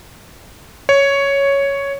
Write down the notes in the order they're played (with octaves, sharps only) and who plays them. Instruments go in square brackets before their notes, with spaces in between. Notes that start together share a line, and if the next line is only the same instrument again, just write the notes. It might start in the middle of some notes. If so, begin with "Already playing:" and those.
[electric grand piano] C#5